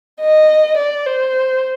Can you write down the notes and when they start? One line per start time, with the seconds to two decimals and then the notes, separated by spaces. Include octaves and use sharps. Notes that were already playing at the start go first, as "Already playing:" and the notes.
0.21 D#5
0.77 D5
1.06 C5